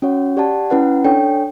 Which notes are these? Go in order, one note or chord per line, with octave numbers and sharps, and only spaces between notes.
C#4 F#4 C#5 F#5
G4 D5 F#5 A5
C#4 E4 B4 F#5
D4 A4 C#5 G5